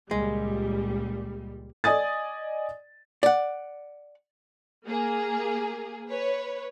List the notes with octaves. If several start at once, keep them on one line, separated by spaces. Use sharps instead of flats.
C#2 A#2 G3 G#3
D5 D#5 G#5 D#6 A6
D5 F#5
A#3 G#4
B4 C#5